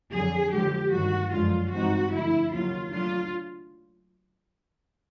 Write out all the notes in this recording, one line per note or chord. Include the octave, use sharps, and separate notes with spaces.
F2 D3 F#3 G#4
D3 F3 G#3 G4
G2 D#3 F#3 A3 F#4
F#2 D3 F3 G#3 F4
G2 E3 G#3 C4 D#4 F#4
D3 F3 A3 E4
D#2 C#3 F#3 F4
F#3 A3 D4 F4